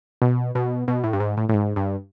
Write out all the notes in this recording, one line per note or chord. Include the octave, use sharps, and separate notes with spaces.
B2
B2
B2
A2
G2
G#2
A2
A2
G#2
G2